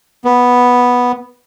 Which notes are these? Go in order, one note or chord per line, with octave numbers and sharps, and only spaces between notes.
B3